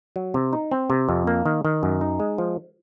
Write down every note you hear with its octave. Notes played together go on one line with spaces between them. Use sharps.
F#3
C3
D#4
C4
C3
F2
A#3
D#3
D#3
F#2
D#4
G#3
F3